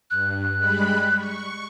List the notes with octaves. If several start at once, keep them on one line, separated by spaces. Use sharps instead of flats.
G2 F#6
G3 G#3 B5
C#6